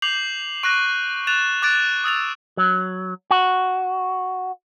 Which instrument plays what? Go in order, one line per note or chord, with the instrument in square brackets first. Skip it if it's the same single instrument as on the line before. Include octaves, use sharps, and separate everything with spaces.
[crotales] D6 G6 C7 F7 F#7
C#6 F#6 A#6 D#7
F#6 A6 E7 F7
D6 F#6 A6 D7
D#6 E6 A6 F7
[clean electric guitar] F#3
F#4